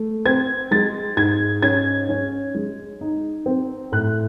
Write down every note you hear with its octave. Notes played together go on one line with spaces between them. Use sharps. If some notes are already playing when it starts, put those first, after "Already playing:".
Already playing: A3
C4 G#6
G#3 A6
G#2 G#6
C#4 G#6
C#4
G#3
D#4
C4
A2 F#6